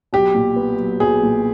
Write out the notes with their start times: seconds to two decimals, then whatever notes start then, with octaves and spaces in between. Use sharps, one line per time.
0.13 B1 G4
0.35 A#2
0.56 B3
0.79 F#3
1.00 B1 G#4
1.23 A#2